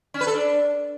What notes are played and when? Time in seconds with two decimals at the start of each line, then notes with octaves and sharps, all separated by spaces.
0.14 C#4
0.21 B4
0.27 A4
0.34 D4